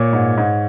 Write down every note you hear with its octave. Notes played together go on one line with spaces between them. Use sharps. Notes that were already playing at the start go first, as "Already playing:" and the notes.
Already playing: A#2 C#5
G#2
G#2